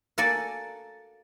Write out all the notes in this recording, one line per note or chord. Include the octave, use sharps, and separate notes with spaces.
A#3 F#4 A4 D5 G#5